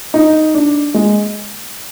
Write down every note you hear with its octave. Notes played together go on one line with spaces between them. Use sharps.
D#4
D4
G#3